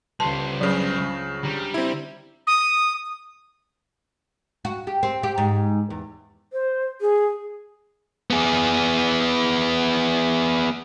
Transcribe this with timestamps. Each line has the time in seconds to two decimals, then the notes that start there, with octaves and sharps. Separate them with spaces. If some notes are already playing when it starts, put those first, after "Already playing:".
0.20 C#2 G3 B3 C5 A5 C6
0.61 G2 C#3 F#3
1.43 D3 G3 A#5
1.74 C4 E4
2.47 D#6
4.65 F#4
4.87 G4
5.03 C4
5.23 G4
5.38 G#2
5.90 E2
6.53 C5
7.01 G#4
8.30 B3 G#4